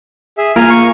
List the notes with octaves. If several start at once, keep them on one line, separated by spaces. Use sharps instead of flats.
G#4 E5
A#3 F4 A#4 G#5 F6
C#6